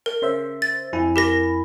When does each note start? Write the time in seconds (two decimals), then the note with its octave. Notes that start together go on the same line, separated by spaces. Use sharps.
0.06 A#4
0.22 C#3 C5 E5
0.62 A6
0.93 F2 E4 G#5
1.16 G4 A#4 B5 A#6